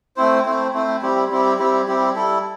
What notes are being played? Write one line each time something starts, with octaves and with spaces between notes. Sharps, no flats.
A3 C4 E4 C5
A3 C4 E4 C5
A3 C4 E4 C5
G3 C4 E4 G4
G3 C4 E4 G4
G3 C4 E4 G4
G3 C4 E4 G4
G3 E4 A4